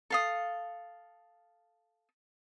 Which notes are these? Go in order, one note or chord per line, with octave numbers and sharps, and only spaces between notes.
A4 F5 D#6